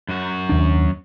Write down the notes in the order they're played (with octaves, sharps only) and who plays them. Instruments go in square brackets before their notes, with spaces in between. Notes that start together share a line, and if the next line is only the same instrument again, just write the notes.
[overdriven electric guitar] F#2 F#4
[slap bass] D#2 D4